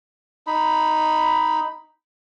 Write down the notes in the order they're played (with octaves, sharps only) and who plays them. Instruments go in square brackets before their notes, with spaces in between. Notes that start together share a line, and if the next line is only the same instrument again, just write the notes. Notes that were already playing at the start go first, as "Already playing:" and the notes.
[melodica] D#4 B5